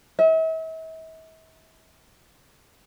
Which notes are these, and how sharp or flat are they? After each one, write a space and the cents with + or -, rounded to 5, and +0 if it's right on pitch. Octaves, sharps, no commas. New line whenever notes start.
E5 -40